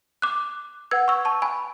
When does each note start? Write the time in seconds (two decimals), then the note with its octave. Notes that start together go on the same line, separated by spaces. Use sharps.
0.22 D6 F#6
0.91 B4 F#5 E6 G#6
1.08 C#6 E6
1.25 A5 C#6
1.42 G#5 B5